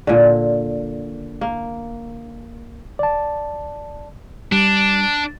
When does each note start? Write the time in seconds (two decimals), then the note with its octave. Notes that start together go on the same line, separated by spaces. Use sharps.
0.07 A#2 D3
1.41 A#3
2.99 D5 A5
4.52 G3 D4